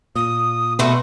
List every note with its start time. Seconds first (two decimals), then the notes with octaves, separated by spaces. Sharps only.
0.16 A#2 D#6
0.79 B2 A3 F#4 B4 C6